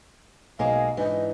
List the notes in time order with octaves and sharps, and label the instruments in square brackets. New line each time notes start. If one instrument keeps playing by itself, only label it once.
[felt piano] B1 [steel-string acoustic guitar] G#3 A#3 G#4 [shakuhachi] F5
[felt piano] G#2 D4 [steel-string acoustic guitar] E3 [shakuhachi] D#5